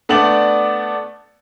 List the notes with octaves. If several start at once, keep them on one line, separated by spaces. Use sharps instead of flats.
A3 B3 D4 D5 F#7